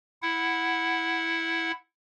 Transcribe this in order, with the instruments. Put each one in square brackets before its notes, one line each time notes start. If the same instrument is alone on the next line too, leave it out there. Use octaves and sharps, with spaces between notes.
[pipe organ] E4 F#5